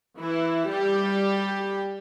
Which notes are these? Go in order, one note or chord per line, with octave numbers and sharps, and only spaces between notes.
E3 E4
G3 G4